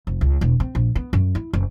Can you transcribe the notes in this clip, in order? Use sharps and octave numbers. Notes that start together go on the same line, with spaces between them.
F1
C#2
E1
C4
A#1
B3
F#2
E4
F#1